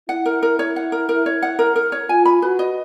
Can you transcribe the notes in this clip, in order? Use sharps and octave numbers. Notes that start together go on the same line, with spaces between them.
E4 F#5
A#4
A#4
C#5
F#5
A#4
A#4
C#5
F#5
A#4
A#4
C#5
F4 G#5
B5
F#4 B4
D#5